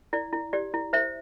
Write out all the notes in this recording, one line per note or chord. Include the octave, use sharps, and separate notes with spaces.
E4 D5
E4
G4 D5
E4
C5 E5